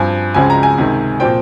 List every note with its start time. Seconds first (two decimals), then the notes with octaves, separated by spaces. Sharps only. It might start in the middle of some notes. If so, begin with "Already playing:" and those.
Already playing: G2 F3 C4 G#5
0.34 C#2 C#3 F3 G#3 C4 G#5
0.50 A#5
0.63 G#5
0.78 C#2 C3 D#3
1.20 A#2 F3 C4 G5